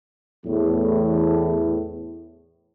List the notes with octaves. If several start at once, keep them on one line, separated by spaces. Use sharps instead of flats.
E2 A2